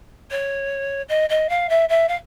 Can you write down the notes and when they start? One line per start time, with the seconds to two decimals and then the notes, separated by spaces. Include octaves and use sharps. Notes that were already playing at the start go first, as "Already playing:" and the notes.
0.31 C#5
1.09 D#5
1.29 D#5
1.49 F5
1.69 E5
1.89 E5
2.08 F5